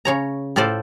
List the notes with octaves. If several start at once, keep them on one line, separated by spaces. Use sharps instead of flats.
C#3 C#5 A#5
A2 F4 A4 C5 D5